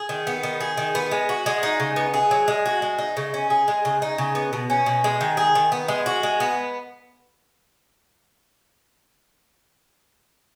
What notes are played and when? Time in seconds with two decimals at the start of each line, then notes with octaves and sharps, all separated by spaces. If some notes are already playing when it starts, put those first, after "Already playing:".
Already playing: G#4
0.09 D#3
0.27 B3
0.43 D#3
0.60 G#4
0.77 D#3
0.95 B3
1.11 G#3
1.29 F#4
1.46 G#3
1.63 D#4
1.80 C#3
1.96 B3
2.14 G#4
2.31 F#3
2.48 G#3
2.66 F#4
2.82 G#3
2.98 D#4
3.17 C#3
3.34 C#4
3.50 G#4
3.68 G#3
3.85 C#3
4.02 D#4
4.18 C#3
4.35 B3
4.53 B2
4.70 C#4
4.86 B2
5.04 G#3
5.21 D#3
5.37 G#4
5.55 D#3
5.72 B3
5.88 G#3
6.06 F#4
6.23 G#3
6.40 B3